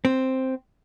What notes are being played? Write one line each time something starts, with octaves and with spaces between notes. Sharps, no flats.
C4